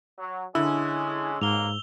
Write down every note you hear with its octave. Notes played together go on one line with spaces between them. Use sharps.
F#3
D3 G#3 C#4 E4 G#4 E6
B1 G#2 A#3 F7 G7